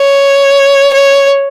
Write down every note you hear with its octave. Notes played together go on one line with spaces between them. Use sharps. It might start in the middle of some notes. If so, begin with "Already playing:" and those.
Already playing: C#5
C#5